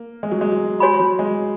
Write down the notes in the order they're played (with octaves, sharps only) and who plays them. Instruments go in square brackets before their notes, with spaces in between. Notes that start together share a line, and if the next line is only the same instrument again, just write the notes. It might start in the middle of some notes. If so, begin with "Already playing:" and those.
Already playing: [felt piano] A#3
G#3
F#3
G#3
F#3
[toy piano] F#4 C#5 G#5 B5
[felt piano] F#3
G#3